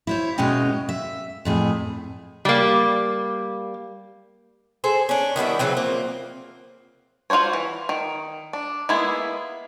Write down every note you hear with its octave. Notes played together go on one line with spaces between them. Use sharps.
E4 C5 C#5
D#2 B2 G#3 C#4 D#5 G5
E5
F2 A2 G#4
G3 A#3
G#4 A4 C5
C#4 D4
D#3 G3 B3 E4
C#3 E3 F#3 C4
F3 A#3 C4
F4 F#4 A4 C5 C#5
E3
D#3
D4
G#3 A#3 B3 E4 G#4